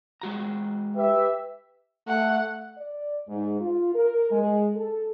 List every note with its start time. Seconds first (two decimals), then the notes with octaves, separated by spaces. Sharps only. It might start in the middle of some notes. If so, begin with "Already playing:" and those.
0.21 G#3 F#4 A#5
0.97 G4 B4 E5
2.08 A3 F#5
2.78 D5
3.28 G#2
3.61 F4
3.94 A#4
4.32 G#3
4.75 A4